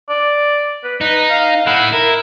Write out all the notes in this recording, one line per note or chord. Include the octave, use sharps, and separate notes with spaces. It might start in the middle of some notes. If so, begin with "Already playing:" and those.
D5
B4
D#4 B4
F5
A3 E4 F#5
E4 A#4